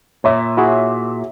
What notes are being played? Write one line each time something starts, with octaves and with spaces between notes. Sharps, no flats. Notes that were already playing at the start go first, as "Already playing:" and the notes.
A#2 C#5 E5
E4 F#4 G#4